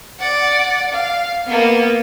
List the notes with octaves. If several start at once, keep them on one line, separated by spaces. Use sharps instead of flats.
D5 F#5
F5
A#3 B3